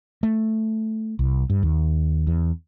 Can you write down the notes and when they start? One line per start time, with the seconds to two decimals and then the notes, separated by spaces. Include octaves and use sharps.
0.23 A3
1.19 C2
1.50 G2
1.63 D#2
2.27 E2